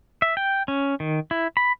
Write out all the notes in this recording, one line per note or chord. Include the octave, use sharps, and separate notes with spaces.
E5
G5
C#4
D#3
E4
B5